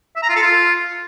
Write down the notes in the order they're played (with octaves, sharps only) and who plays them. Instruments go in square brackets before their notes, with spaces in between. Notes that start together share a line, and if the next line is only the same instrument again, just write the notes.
[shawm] E5
A#5
F4
A4
F4